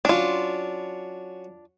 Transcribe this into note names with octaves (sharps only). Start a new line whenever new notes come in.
F#3 C#4 D4 F4